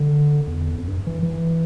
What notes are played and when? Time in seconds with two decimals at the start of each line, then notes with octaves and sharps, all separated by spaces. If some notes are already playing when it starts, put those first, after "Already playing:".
Already playing: D3
0.47 E2
0.78 F2
0.88 G2
1.07 E3
1.23 E3